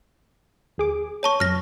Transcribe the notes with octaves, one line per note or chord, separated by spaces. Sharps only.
D#2 G#4 D6
C#5 A5 C#6
F#2 F6 A#6